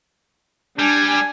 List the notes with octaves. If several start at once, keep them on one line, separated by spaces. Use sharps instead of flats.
G3 D4 G#5